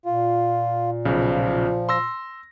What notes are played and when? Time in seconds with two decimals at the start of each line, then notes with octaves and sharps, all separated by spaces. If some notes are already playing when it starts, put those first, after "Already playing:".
0.06 A#2 F4
1.05 B1 C#3 F3
1.89 C6 E6 A#6